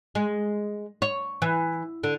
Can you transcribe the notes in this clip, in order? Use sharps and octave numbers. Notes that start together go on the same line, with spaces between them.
G#3
C#5
E3
D3